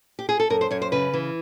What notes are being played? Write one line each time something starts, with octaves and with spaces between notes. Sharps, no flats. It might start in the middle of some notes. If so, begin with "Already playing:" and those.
G4
G#4
A4
F#2 A#4
C5
F#2 C#5
C5
C#3 B4
E3